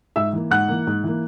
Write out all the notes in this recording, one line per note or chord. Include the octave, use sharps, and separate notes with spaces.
G#2 E5 E6
E3 A#3
G#2 F#5 F#6
E3 A#3
G#2
E3 A#3